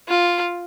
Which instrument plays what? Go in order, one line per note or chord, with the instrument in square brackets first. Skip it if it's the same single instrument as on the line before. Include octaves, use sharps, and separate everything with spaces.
[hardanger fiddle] F4